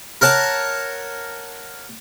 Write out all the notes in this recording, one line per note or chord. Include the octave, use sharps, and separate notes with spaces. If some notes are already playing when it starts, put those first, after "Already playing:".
A#4 C#5 F#5 A5